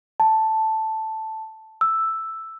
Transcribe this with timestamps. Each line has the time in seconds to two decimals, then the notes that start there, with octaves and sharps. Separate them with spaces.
0.20 A5
1.81 E6